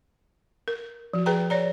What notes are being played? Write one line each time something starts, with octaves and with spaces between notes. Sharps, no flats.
A#4
F3 F#4
G#4 B4 G5 A#5
C#5 D5 A#5